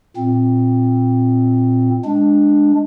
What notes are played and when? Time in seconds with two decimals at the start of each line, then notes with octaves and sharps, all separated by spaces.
0.17 A#2 C4
2.05 G#3 D4